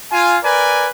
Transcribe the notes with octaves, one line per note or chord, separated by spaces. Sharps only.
F4 G#5
A#4 B4 D5 G#5